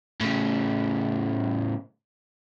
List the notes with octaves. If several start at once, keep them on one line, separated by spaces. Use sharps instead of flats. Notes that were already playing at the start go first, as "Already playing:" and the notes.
A2 C#3